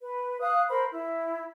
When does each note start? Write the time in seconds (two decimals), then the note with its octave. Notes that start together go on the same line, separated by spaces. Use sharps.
0.01 B4
0.40 F5 D#6 F#6
0.69 A#4 C5 B5
0.92 E4